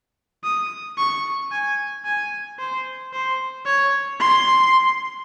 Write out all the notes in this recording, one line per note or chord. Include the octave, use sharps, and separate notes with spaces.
D#6
C#6
G#5
G#5
C5
C5
C#5
C6